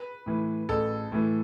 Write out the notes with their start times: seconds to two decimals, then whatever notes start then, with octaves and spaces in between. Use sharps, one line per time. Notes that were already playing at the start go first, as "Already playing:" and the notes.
Already playing: B4
0.26 A2 E3
0.69 A1 A4
1.12 A2 E3